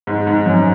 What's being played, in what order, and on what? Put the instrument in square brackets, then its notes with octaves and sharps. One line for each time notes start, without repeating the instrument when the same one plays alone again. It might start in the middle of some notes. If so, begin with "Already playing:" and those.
[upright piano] G#2
G#2
F#2